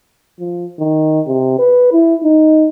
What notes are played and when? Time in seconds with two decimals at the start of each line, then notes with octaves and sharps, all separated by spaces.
0.39 F3
0.79 D#3
1.27 C3
1.59 B4
1.92 E4
2.24 D#4